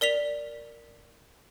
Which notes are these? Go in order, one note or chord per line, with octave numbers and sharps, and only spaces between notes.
A#4 D5 B6 F7